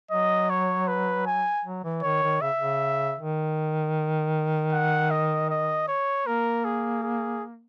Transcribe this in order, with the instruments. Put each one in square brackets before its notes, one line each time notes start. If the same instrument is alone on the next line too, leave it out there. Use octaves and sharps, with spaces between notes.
[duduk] F#3 [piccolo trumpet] D#5
[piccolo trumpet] C#5
B4
G#5
[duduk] F#3
E3
[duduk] D#3 [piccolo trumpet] C#5
[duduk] D#3
[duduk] C#3 [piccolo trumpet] E5
[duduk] C#3
D#3
[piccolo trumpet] F#5
D#5
D#5
C#5
[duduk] A#3 [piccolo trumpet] A#4
[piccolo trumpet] G#4
G#4